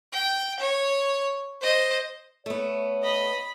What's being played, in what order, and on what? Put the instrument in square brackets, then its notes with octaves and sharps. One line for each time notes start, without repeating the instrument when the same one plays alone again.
[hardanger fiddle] G5
C#5
C5 D#5
[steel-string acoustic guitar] A3 B3 [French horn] C#5
[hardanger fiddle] D#5 [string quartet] B5